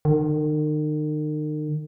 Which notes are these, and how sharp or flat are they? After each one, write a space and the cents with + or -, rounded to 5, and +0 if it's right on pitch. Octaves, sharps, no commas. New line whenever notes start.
D#3 -40